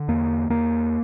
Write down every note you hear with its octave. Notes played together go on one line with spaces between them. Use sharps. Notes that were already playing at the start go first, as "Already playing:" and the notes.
Already playing: D3
E2 A#3
E2 A#3